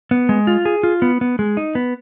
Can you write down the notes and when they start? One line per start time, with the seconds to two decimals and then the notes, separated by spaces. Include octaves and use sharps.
0.11 B3
0.29 G#3
0.47 F4
0.65 G#4
0.83 F4
1.02 B3
1.21 B3
1.39 G#3
1.57 D#4
1.75 B3